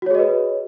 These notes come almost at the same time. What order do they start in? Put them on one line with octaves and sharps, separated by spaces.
F#4 C#5 G#4 D#5 B4